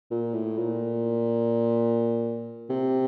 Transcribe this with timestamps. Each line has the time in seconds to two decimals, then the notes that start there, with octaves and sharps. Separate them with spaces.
0.11 A#2
0.33 A2
0.58 A#2
2.70 C3